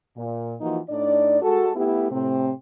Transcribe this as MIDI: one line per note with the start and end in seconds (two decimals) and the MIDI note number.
0.17 0.55 46
0.61 0.79 52
0.61 0.79 53
0.61 0.79 58
0.61 0.79 63
0.61 0.79 65
0.61 0.79 66
0.90 1.41 45
0.90 1.41 62
0.90 1.41 63
0.90 1.41 74
1.42 1.71 56
1.42 1.71 66
1.42 1.71 69
1.76 2.12 57
1.76 2.12 59
1.76 2.12 64
1.76 2.12 67
2.12 2.51 45
2.12 2.51 48
2.12 2.51 60